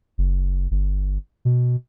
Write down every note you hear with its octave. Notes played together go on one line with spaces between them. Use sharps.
F#1
G1
B2